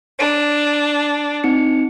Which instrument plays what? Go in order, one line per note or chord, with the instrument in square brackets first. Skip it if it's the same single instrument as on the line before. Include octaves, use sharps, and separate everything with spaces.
[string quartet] D4
[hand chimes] C4 D#4 C#7